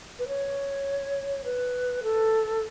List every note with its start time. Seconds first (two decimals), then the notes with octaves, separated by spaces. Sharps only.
0.19 B4
0.28 C#5
1.45 B4
2.03 A4